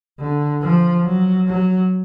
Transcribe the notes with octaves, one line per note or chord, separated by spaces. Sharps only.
D3
F3
F#3
F#3